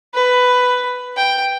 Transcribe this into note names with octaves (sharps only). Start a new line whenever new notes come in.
B4
G5